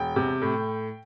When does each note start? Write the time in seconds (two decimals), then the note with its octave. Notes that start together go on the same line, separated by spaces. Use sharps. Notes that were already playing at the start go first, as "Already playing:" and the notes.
Already playing: E1 G5
0.16 C3
0.42 A2